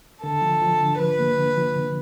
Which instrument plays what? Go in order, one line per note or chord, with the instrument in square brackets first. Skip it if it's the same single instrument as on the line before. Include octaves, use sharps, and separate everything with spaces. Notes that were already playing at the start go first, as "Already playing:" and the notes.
[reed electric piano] D3 [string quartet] A4
[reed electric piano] F3
F3
D3
[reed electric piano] F3 [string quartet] B4
[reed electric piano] A#3
D3
F3
D3